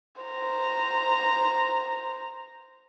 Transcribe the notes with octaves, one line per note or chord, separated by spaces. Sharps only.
C5 A#5